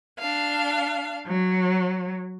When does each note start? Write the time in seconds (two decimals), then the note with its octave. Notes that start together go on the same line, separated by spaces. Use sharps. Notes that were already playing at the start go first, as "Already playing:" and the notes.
0.18 D4 F5
1.25 F#3